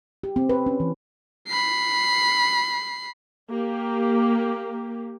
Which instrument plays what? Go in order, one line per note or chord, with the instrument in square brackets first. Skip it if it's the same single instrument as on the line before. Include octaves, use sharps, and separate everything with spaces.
[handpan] G4
C4
B4
C#4
E3
[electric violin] B5 C7
[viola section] A#3 G4